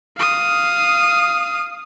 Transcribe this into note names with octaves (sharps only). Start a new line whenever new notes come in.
F5 D#6